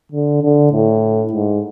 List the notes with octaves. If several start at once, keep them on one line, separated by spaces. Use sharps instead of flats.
D3
D3
A2
G#2